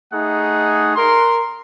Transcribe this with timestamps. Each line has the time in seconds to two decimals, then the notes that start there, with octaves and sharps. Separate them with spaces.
0.13 A3 D#4 G#4 F#5
0.96 A#4 C6